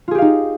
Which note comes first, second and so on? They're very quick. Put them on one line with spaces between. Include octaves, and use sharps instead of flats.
F4 G#4 G4 F5 D#4